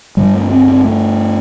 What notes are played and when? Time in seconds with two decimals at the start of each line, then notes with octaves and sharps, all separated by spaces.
0.17 G2 D3 G3
0.34 A3
0.50 C4
0.68 C4
0.84 A3